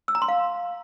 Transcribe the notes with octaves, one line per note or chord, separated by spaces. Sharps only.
E6
A#5
C6
F5